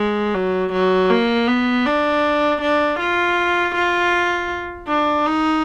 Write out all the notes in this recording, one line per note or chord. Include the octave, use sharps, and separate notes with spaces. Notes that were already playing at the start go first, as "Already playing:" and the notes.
Already playing: G#3
F#3
F#3
A#3
B3
D4
D4
F4
F4
D4
D#4